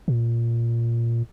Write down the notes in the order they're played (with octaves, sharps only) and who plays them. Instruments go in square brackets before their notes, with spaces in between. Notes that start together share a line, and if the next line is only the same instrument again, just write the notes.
[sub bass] A#2